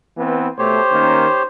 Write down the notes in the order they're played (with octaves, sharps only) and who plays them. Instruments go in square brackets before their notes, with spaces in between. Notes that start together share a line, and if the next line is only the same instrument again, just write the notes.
[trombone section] E3 B3 C4
[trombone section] B2 A3 [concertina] G4 C#5 [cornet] C5
[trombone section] D#3 A#3 C#4